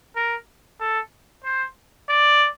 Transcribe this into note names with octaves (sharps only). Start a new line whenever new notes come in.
A#4
A4
C5
D5